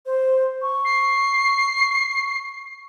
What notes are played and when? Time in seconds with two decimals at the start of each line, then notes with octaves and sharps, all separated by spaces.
0.06 C5
0.62 C#6
0.85 C7